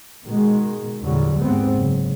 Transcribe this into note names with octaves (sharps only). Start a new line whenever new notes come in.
B2 D#3 G#3
E2 A#2 D3 F#3 G3
D#2 G#2 B3 C4
F#1